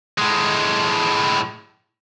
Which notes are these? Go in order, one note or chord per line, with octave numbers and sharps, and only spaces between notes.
A2 G#3